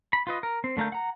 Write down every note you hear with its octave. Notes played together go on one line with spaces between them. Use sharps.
B5
F4 B4 D#5
A#4
C4
D3 A3 A#4 F5 G6
F#5 A#5